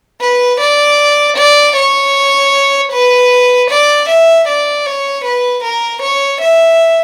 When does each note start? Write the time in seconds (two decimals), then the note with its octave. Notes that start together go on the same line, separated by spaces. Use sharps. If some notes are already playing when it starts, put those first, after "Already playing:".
0.21 B4
0.60 D5
1.37 D5
1.76 C#5
2.92 B4
3.71 D5
4.09 E5
4.48 D5
4.86 C#5
5.25 B4
5.64 A#4
6.02 C#5
6.41 E5